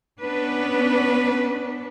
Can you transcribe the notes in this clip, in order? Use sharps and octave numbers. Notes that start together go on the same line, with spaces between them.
B3 C#4 D4 B4